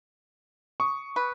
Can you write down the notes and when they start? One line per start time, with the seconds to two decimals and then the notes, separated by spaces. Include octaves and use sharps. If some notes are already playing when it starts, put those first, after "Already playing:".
0.80 C#6 D#6
1.16 B4